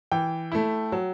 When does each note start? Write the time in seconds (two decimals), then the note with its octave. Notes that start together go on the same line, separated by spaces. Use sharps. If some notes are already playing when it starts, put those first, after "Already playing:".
0.12 E3 G5
0.52 A3 E4
0.92 F#3